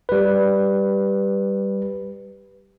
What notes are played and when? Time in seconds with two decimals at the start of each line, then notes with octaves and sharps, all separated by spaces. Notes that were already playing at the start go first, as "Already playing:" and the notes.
0.09 G3 B4